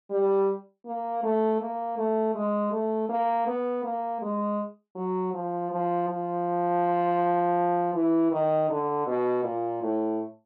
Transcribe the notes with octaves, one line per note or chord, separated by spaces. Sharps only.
G3
A#3
A3
A#3
A3
G#3
A3
A#3
B3
A#3
G#3
F#3
F3
F3
F3
E3
D#3
D3
B2
A#2
A2